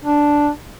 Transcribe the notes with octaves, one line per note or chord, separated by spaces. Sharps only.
D4